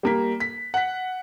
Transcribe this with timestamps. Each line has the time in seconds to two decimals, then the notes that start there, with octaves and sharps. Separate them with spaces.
0.03 G3 A#3 B6
0.40 B6
0.74 F#5 B6